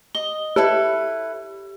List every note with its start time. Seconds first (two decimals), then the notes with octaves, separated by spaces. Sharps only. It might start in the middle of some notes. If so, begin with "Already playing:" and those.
0.15 D#5 G7
0.56 E4 G4 A4 B4